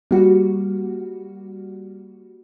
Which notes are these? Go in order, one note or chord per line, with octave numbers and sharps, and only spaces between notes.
G3 A#3 F#4